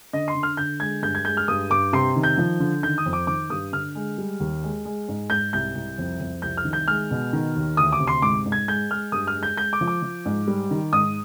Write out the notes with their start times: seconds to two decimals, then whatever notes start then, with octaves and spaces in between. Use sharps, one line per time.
0.13 D3 D#5
0.28 C6
0.35 D3
0.43 F6
0.57 D3 G6
0.80 G#3 G#6
1.02 G2 G6
1.15 G#6
1.25 G#3 G6
1.37 F6
1.48 G2 D#6
1.70 G2 D6
1.93 C3 C6
2.16 D#3
2.23 G6
2.38 F3
2.60 D3
2.83 D#3 G6
2.98 D#6
3.06 F2
3.13 D6
3.27 D#3 D6
3.50 G2 D#6
3.72 D3 F6
3.95 G#3
4.18 G3
4.40 D#2
4.63 G#3
4.85 G#3
5.08 G#2
5.30 G#2 G6
5.53 C2 G6
5.75 C2
5.98 F2
6.21 F2
6.42 C2 G6
6.57 F6
6.65 D#3
6.73 G6
6.88 G#3 F6
7.11 B2
7.33 D#3
7.56 D#2
7.77 D2 D#6
7.92 D6
8.00 C3
8.07 C6
8.22 G#2 D6
8.46 G#2
8.52 G#6
8.68 G#3 G6
8.90 G#3 F6
9.12 G2 D#6
9.27 F6
9.35 G#3
9.43 G6
9.57 G#3 G6
9.73 D6
9.81 F3
9.88 D6
10.02 F3
10.26 G#2
10.47 G3
10.71 D#3
10.93 G#2 D#6